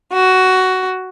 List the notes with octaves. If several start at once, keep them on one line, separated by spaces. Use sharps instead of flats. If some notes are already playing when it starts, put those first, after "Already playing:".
F#4